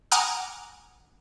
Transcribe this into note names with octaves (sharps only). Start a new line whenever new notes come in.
F#5 G#5 A#5 D6 D#6 F6